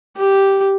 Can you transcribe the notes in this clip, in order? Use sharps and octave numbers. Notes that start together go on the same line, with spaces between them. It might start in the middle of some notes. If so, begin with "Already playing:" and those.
G4